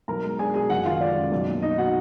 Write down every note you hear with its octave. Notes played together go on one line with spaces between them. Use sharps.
B1 A#4 A#5
G#3
D4 G#4 G#5
B2 G#4 G#5
F#1 F#4 F#5
D#3 F4 F5
G#3 D5
F#2
B1
A#3
D#4 D#5
B2 F#4 F#5